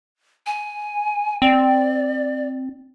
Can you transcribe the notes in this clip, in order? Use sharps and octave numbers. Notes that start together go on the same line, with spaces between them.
G#5
C4 D5